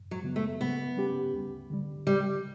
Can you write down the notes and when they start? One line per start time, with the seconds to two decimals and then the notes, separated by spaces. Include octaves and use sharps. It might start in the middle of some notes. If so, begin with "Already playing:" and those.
Already playing: F#2
0.11 F#3
0.23 C#3 F#3 B3
0.36 A3
0.60 C#3 B3
0.97 G3 C#4 G4
1.33 D2
1.70 D3 G3
2.07 C#3 G3